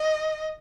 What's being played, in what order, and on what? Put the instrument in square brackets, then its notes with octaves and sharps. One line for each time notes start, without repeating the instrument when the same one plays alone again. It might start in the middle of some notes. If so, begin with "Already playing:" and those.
Already playing: [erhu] D#5